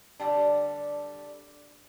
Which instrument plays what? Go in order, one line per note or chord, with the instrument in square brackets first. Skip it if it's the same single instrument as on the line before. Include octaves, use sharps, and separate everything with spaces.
[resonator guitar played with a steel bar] D3 G3 D4